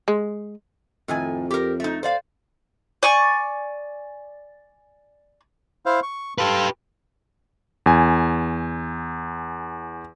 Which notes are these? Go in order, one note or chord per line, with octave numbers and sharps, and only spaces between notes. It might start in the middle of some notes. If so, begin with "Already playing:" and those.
G#3
F2 A2 D#3 G#5
G4 A#4
A3 D#4
C5 D5 F5
D5 G#5 C#6
E4 C5 F5
C#6
G4 A4 B4 F5 C6
E2 G#5